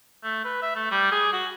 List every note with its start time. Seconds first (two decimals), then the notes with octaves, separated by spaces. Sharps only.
0.24 A3
0.45 B4
0.62 E5
0.76 A3
0.91 G3
1.12 G#4
1.33 F#4